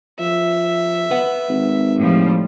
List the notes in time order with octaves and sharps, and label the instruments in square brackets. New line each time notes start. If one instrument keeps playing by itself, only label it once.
[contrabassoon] F3 [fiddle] E5
[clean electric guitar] B4 F#5
[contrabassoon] G#1
[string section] A2 F3 G3